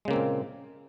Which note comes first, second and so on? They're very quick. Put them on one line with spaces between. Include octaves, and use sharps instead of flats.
G#3 C#3 A#3 C4 A#2